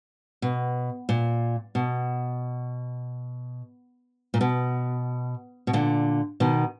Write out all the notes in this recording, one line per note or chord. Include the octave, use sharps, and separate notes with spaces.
B2
A#2
B2
A#2
B2
B2
A#2 D3
B2 D#3